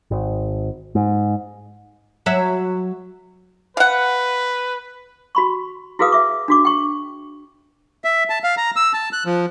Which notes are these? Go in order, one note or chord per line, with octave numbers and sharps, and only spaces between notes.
G#1
G#2
F#3 E5
B4 F5 F#5
F#4 B5 C#6
E4 F#4 G#4 B4 F5 D#6
E5 D6
D4 F#4 D6
G5 C#6
E5
A5
F5
A#5
E6
A5
F#6
F3